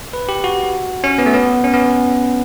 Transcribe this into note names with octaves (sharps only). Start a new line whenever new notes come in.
B4
G4
F#4
C#4
B3
A3
B3
C#4
B3